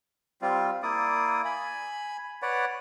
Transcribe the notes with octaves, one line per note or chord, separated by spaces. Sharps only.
G3 C4 F4
A#3 E4 D5 D#6
G#5 B5
B4 C#5 D5 F#5